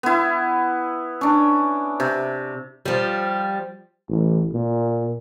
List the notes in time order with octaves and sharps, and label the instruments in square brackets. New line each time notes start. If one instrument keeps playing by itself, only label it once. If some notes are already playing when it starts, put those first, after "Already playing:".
[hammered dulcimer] B3 E4
C#4 D4
C3
[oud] F3 G3
[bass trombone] A1
A#2